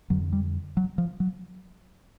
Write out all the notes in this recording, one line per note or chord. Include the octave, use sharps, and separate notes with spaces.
F2 D3 F#3
G3
F#3
F3
F#3